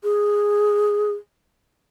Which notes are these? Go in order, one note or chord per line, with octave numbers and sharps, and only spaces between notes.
G#4